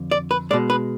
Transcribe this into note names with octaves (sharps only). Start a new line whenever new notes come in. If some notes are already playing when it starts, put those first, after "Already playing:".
Already playing: F2 D3
D5
B4
B2 G#3 D5
B4